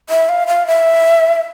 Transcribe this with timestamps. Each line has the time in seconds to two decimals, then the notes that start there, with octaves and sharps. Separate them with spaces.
0.10 E5
0.29 F5
0.47 F5
0.67 E5